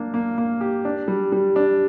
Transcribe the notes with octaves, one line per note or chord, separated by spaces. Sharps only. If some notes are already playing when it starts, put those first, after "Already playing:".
Already playing: A#3 D4
A#3
A#3
G4
D4
G3
G3
D4